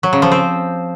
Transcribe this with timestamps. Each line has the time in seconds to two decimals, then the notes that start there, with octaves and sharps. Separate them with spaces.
0.03 F#3
0.13 C#3
0.22 F3
0.32 C4